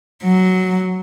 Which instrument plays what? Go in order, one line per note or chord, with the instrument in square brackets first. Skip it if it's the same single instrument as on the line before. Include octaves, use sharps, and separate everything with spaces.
[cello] F#3